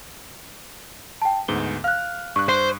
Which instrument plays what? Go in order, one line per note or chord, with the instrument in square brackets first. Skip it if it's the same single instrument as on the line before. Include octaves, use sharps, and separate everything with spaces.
[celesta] G5 A5
[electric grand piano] D2 G#2 B3 [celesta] G7
[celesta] F5 F#6 [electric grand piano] F6
[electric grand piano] G2 F#6 [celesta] C#6
[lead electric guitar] C5